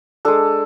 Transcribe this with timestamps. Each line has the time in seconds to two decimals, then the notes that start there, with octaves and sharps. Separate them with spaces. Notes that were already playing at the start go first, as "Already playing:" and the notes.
0.25 G#3 D4 A4